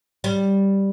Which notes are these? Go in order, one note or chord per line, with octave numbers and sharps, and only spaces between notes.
G3